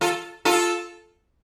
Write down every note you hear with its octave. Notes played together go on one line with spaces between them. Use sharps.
F4 A4
F4 A4